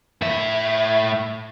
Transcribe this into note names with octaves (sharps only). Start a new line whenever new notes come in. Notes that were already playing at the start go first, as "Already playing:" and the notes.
A2 E5